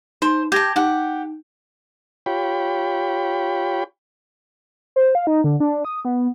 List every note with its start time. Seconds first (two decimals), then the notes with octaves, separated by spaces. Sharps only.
0.22 D#4 C5
0.52 G4 A5 G6 G#6 A#6
0.76 D#4 G4 F#5
2.26 F4 G4 C#5 G5 B5
4.96 C5
5.15 F5
5.27 D#4
5.44 D3
5.60 D4
5.85 D#6
6.05 B3